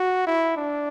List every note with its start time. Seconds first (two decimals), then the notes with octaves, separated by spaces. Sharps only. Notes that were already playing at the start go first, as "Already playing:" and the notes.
Already playing: F#4
0.27 E4
0.56 D4